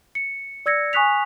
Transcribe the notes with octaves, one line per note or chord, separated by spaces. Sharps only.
C#7
D5 E6 G#6 A#6 C#7
G#5 C#6 D#6 F#6 B6 F7